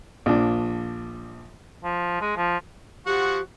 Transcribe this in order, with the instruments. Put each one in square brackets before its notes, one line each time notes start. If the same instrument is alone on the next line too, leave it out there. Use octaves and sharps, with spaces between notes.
[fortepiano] A#1 F3 D4
[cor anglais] F3
G#3
F3
[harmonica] F3 F#4 F#5 [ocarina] G4